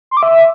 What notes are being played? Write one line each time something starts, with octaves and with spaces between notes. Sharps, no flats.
C6
D6
E5